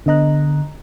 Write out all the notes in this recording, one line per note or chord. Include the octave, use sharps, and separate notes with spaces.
D3 B3 D#5 A#5 F#6